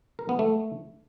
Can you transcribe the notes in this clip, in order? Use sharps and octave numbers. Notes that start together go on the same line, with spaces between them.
A#4
B3
A3